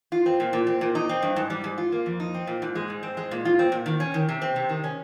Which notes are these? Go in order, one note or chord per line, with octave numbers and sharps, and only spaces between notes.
F4
C4
A#2
A#2
C4
A#2
D#4
C4
G2
G#2
G3
G#2
F4
A#3
F2
D#4
C4
A#2
G#2
G#3
G#2
C4
G#3
A#2
F4
C4
A#2
D#3
C#4
D#3
C3
C4
C3
D#3
C#4